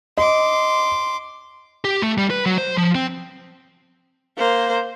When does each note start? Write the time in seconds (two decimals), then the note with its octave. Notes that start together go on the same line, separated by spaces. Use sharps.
0.17 D#5 C6 D6
1.85 G4
2.02 A3
2.18 G3
2.30 B4
2.46 F#3
2.58 C5
2.77 F3
2.95 C4
4.37 A#3 C5